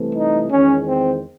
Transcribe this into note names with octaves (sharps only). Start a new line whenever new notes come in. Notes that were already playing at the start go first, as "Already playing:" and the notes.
Already playing: C2 C3 E3 A3
D#4
E2 D#3 G#3 C#4
C4